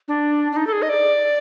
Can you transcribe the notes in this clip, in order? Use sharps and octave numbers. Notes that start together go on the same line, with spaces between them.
D4
D4
D#4
A4
G#4
D#5
D5